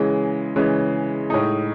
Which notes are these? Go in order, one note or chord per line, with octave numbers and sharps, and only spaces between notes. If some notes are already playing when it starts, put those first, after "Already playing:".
Already playing: C#3 E3 G#3 C#4
C#3 E3 G#3 C#4
A2 G#3 D#4